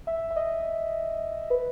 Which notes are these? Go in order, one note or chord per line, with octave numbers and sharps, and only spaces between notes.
E5
E5
D#5
B4